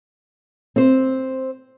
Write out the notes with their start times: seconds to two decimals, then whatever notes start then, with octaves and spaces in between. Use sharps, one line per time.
0.76 C4 C5